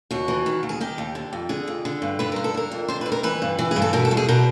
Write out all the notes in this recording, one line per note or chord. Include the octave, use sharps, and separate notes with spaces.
D#2 F#4
E3
D#3
D#2
G#4
D#3 G4
D#2
D3
F2
D3 G#4
F2
D3
G2
D3 B4
G2 A#4
A4
D3 A#4
F2
D3 C5
B4
F2
A#4
E3 B4
G2
E3
G#4
G2
A4
B2 A#4
A4
E2
G#4
B2 A#4